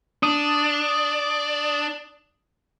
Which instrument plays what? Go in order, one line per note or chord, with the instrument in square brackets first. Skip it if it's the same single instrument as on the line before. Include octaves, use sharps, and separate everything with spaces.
[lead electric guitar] D4 [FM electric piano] D#6